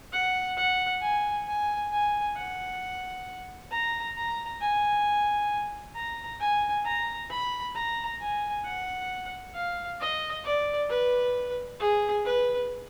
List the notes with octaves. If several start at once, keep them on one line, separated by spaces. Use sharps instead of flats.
F#5
F#5
G#5
G#5
G#5
F#5
A#5
A#5
G#5
A#5
G#5
A#5
B5
A#5
G#5
F#5
F5
D#5
D5
B4
G#4
B4